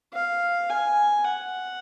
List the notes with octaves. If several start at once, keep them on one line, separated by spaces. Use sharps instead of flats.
F5
G#5
F#5